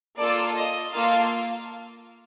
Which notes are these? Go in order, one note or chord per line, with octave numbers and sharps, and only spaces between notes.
A#3 F4 A4 D5
D#5
A#3 F4 A4 F5